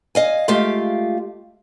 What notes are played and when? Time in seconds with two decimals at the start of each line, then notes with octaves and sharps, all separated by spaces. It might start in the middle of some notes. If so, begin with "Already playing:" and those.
0.15 D#5 F5 G#5
0.48 G#3 A3 F4 G4 F5